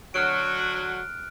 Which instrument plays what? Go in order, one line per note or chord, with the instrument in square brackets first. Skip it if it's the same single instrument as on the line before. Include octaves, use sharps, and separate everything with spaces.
[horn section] D3 F#3 F#4 [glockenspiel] F6 F#6 D7